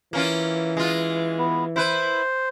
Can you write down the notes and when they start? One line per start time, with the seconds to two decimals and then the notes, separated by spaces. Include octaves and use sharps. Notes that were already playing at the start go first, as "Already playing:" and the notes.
0.13 E3 A#3 C#4 F4
0.77 G#3 F4
1.38 B3
1.76 E4 B4 C5